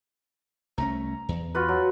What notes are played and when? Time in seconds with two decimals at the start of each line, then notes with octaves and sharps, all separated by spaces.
0.78 C2 A3 C#4 A#5
1.29 E2
1.55 F4 F#4 B4
1.69 F#3